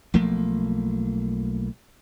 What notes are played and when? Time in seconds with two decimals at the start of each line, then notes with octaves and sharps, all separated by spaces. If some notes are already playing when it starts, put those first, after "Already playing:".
0.14 B1 F3 A3 A#3